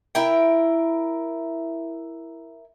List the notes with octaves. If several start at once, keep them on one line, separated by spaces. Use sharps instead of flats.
E4 A#4 G5